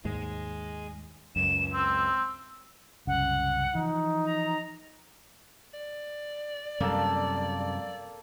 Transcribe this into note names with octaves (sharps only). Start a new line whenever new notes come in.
D#2 G#2 G#3
C#2 F#2 E7
C4 E6
C2 F#2 C#3 F#5
E3 F3 D#4
A#5
D5
F#2 C3 G3 A#3 A4 A5